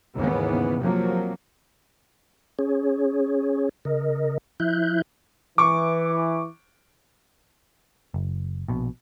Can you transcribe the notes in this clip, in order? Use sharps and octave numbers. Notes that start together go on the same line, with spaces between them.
D#2 G#2 C#3 E3 B3
C3 F3 F#3 A#3
C#4 G#4 C#5
C#3 A#4 D#5
F3 E4 E5 F#6 G6
E3 C#6 D6
F#1
A#1 B2